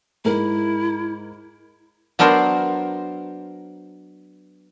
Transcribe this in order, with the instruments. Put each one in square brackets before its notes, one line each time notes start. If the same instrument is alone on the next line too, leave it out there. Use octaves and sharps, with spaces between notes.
[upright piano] G#2 A#4 [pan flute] E4
[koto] F#3 B3 D4 A#4 C5